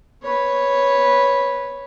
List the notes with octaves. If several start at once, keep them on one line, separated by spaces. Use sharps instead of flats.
B4 C#5